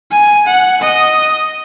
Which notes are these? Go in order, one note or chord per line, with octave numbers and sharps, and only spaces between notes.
G#5
F#5
D#5